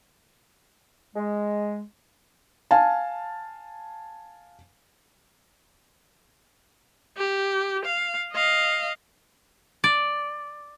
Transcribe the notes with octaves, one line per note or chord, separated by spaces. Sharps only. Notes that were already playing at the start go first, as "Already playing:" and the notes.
G#3
F5 G#5 A5
G4
F5
D#5 F5
D5